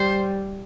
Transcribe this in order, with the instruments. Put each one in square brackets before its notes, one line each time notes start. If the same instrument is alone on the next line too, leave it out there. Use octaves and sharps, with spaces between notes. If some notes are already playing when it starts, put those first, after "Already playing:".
Already playing: [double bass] G3 [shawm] C5